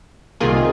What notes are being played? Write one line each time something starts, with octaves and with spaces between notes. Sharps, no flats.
C2 C3 D#3 A#3 F4 G#4